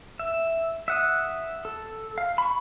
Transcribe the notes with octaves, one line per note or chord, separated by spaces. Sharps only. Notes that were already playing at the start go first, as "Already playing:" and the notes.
E5
E5 F#5 D#6
A4
F5
B5 C#6